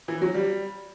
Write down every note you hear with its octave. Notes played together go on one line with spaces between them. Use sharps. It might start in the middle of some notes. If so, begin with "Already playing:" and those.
E3
F#3
G3